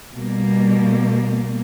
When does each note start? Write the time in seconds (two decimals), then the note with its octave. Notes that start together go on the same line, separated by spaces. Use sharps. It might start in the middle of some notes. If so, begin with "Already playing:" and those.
0.16 B2 G3 A#3